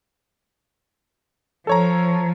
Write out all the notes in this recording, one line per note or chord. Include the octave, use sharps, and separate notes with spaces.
F3 A4 C#5 A#5